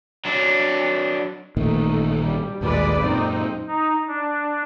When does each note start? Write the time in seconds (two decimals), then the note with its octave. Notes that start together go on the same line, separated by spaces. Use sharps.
0.25 F#3 D4
1.57 A1 A#2 D#3 A3 D#4
2.22 G3
2.61 A1 D#2 A#2 G#3 B4 D5
3.03 F#2 A#2 C4 D#4
3.67 D#4
4.08 D4